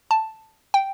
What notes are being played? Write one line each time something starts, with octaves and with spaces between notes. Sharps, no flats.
A5
G5